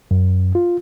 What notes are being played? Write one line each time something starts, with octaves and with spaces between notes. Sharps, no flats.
F#2
F4